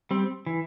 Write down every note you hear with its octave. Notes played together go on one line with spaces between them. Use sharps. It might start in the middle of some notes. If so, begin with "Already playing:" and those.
G3 C4
E3